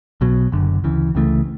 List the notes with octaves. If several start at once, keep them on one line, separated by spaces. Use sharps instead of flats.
B1 B2 F#3
F#1 F#2 D3
D2 C#3 E3
C#2 C#3 E3 A3